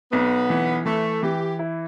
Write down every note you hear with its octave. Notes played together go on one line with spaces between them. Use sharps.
B1 B3
E3
E3 A3
E3 G4
E4